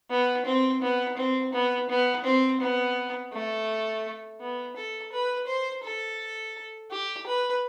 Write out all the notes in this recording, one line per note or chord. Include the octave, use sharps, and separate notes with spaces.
B3
C4
B3
C4
B3
B3
C4
B3
A3
B3
A4
B4
C5
A4
G4
B4